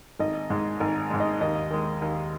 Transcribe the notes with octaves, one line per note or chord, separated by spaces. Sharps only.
G#1 D#5
G#2 G#3
G#1 G#5
G#2 G#3
D#5
D#2 D#5
D#3 G#3
D#2